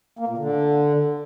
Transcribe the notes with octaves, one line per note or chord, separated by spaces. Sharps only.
A#3
A#2
D3